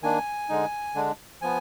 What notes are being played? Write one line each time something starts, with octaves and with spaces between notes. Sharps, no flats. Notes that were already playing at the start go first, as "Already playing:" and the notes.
D#3 A#3 D4 G#5
D3 G#3 D#4
D3 G#3 D4
F3 B3 G#5